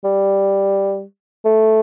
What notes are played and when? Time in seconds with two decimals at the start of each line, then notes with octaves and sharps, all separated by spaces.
0.04 G3
1.45 A3